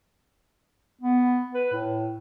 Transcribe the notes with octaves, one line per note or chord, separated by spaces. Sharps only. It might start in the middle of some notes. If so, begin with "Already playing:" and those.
B3
B4
A2